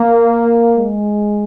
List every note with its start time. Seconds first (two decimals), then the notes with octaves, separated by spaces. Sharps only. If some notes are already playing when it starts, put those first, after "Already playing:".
Already playing: A#3
0.75 G#3